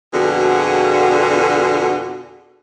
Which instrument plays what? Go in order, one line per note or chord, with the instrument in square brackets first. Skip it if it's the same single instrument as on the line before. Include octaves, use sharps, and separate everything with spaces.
[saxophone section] F2 B2 D3 F#4 G#4